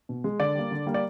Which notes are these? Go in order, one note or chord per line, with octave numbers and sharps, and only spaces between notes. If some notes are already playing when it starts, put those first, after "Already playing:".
B2
G#3
D3 D5
G3 A#3
D3
G3 A#3
D5